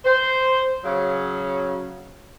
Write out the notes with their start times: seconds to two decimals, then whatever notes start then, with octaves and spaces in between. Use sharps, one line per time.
0.05 C5
0.84 C#3 F#3